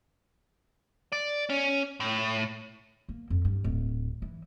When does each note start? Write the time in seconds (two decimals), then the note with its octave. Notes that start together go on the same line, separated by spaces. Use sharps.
1.12 D5
1.50 C#4
2.00 A2
3.09 A#3
3.30 F2
3.45 G2
3.64 D1
4.22 E3